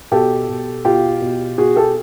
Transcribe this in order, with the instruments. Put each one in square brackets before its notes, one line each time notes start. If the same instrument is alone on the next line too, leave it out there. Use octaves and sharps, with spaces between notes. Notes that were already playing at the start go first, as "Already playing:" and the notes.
[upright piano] B2 G4 A4
B2
B2 F4 G4
B2
B2 F#4 G#4
G4 A4